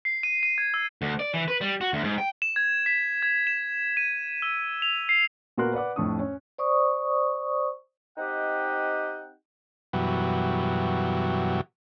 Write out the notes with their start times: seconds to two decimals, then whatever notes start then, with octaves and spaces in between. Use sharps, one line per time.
0.05 C7
0.23 D#7
0.43 D#7
0.58 G#6
0.74 E6
1.02 D2
1.19 D5
1.33 E3
1.48 B4
1.61 G3
1.81 F#4
1.93 D2
2.04 G#2
2.18 G5
2.42 E7
2.56 G#6
2.86 B6
3.23 G#6
3.47 E7
3.97 D#7
4.42 E6
4.82 F7
5.09 C7
5.58 A#2 B3 F#4 A#4 C6 F#6
5.74 B4 D5 F#5 D6
5.96 F2 A2 D4 C#6 D#6
6.19 C#4
6.58 C5 D5 C#6 D#6
8.17 C4 D#4 G4 D#5 F#5 G5
9.93 F#2 B2 E3 F#3 G3